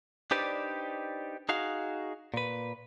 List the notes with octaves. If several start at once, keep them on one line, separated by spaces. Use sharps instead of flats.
D4 D#4 G4 B4 C5 D5
D#4 F#4 G#4 F5
A#2 B4